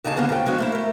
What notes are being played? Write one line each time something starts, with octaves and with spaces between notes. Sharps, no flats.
D#2 C#3 D#4 G#4 G#5 A5
D3 G3 A#3 B3 G#4
D2 C#3 F4 B4 G5
F3 G#3 B3 D4 F#4
A3 A#3 E4
A3 A#4